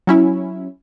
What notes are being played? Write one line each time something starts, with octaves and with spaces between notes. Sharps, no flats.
F#3 C#4 E4